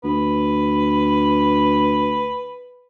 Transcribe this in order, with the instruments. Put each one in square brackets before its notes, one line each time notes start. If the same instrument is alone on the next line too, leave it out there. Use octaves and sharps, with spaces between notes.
[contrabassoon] D2 [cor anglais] B4